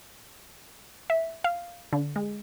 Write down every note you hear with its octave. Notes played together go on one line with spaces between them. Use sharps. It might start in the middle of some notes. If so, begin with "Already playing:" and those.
E5
F5
D3
G#3